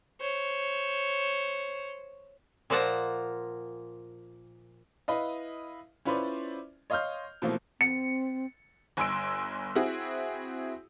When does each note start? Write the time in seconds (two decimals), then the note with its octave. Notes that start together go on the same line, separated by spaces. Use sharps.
0.20 C5 C#5
2.70 A#2 F3 A#3 F#5 A5
5.08 E4 B4 D#5 F5
6.05 C#4 E4 F4 B4 C5 D5
6.90 C#5 D#5 F5 C6 F6 G6
7.42 B2 E3 F3 A3 A#3 C4
7.81 C4 C#7
8.97 G1 G#5 C6 E6 D7
9.75 C4 E4 F#4 G#4